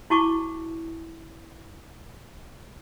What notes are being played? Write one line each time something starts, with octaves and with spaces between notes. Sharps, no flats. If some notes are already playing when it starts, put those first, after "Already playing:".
E4 F#4 A5 C#6 D6